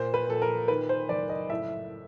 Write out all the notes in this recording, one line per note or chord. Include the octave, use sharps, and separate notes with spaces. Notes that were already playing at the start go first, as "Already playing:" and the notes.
Already playing: A#2 C5
B4
A#2 A4
A#4
D#3 B4
C5
F#1 D5
D#5
A2 E5